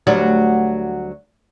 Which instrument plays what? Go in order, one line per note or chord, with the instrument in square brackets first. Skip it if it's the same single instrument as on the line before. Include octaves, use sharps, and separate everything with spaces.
[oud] D2 F#3 G3